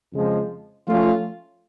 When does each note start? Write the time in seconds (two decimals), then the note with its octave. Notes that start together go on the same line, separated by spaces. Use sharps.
0.12 F2 C#3 F3 G#3
0.86 F3 A3 C#4 F4